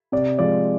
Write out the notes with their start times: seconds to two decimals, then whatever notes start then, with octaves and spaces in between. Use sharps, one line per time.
0.12 C3 D5
0.39 F3 G#3 D5